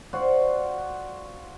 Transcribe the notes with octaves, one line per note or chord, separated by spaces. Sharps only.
F4 F#4 C5 D5